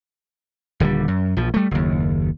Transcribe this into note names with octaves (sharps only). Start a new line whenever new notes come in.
D#1 D3 F3 G3
F#2
A#1 F3
G3 A3
F#1 D#2